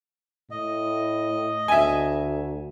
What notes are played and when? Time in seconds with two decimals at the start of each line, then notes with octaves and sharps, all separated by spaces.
0.51 A2 D#5
1.68 D2 E5 G#5